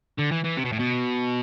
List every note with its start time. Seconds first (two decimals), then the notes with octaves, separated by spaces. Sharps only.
0.19 D3
0.32 E3
0.44 E3
0.57 C3
0.65 B2
0.73 A2
0.79 B2